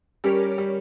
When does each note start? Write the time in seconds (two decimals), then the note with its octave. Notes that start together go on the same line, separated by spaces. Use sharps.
0.24 G3 C#4 G4 A#4 C#5
0.58 G3